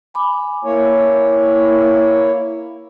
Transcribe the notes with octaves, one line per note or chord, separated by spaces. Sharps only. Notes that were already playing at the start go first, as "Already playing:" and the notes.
G#5 B5 D6
A#3 E4 C#5